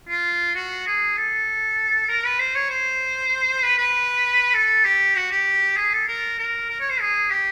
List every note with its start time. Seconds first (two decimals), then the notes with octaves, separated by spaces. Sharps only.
0.09 F4
0.55 F#4
0.87 G#4
1.17 A4
2.09 A#4
2.25 B4
2.39 C5
2.55 C#5
2.70 C5
3.63 B4
3.78 B4
4.54 A4
4.85 G4
5.16 F#4
5.31 G4
5.77 G#4
5.93 A4
6.08 A#4
6.38 A#4
6.69 A#4
6.80 C#5
6.90 C5
7.00 G#4
7.31 G4